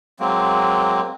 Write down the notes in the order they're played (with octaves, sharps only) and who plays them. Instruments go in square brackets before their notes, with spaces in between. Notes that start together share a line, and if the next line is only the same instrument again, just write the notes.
[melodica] F#3 G#3 A#3 C4